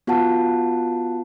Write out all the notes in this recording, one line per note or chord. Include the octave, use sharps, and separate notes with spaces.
B3 F4 F#4 F#5 A5